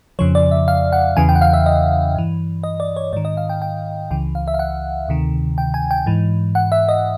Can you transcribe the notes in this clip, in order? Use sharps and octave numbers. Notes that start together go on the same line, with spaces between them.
F2 C#3 F3 C#5
D5
E5
F5
F#5
E2 C#3 E3 G#5
G5
F#5
F5
E5
D#5
G2 E3
D#5
D5
C#5
G#2 D#3 D5
D#5
F5
G5
G5
C#2 C#3 E3 G5
F5
E5
F5
F#5
D2 C3 D#3
G5
G#5
G5
G#2 E3
F#5
E5
D#5